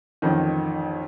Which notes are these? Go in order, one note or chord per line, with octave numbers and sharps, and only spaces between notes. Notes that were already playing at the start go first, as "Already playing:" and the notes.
A1 F2 D#3